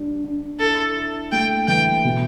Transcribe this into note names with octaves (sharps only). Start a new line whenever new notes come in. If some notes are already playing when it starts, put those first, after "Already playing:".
Already playing: G3 D4
D4
E4 A4
E4
A3 G5
E3 G5
B2